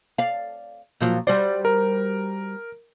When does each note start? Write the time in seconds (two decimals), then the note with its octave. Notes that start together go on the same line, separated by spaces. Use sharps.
0.18 D5 F5
1.00 A#2 F3 F#3
1.27 G3 F#4 C5 D5
1.65 A#4